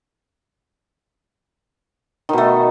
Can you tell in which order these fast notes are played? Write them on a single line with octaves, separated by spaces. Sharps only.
D#3 B2 A3